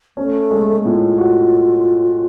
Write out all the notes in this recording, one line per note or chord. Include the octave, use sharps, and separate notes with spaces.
A3 C#4
G#3
A2 F4
F#4